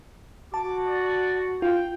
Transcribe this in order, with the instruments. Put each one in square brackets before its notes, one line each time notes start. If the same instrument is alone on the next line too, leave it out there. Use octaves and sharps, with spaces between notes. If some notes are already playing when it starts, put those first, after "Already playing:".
[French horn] F#4 [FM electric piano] A5 [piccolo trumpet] D6
[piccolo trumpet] D5
[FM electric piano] F4 [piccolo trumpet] G5